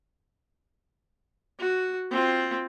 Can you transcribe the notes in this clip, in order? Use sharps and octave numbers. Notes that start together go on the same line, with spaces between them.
F#4
C4 F4